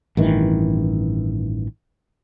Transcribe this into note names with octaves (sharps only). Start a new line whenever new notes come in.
A1 G2 D#3 E3